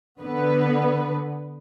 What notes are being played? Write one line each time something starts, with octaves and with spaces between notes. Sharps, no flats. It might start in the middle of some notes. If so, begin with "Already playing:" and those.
D3 B3 B4